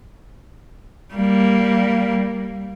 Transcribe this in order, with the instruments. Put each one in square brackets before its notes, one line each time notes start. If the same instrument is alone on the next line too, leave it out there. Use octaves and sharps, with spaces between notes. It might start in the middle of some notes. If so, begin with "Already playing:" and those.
[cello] G3 A#3